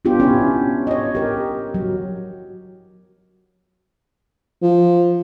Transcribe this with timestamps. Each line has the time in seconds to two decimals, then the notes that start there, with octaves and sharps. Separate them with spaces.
0.05 B3 D4 F4 G4
0.20 C#4 E4 F4
0.87 C#5 D#5
1.15 G4 A#4
1.74 F#3
4.62 F3